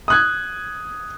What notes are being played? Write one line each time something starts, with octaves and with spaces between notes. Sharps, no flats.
D#6 F#6 G#6